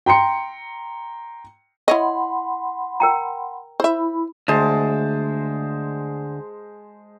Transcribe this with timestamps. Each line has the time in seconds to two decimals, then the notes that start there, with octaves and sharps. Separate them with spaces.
0.06 G5 A#5 C6 C#7
1.88 E4 C#5 D#5 F#5 B5 C6
3.00 A#4 G5 A#5
3.80 E4 C5 E5 B5
4.48 D2 G#3 C5 A5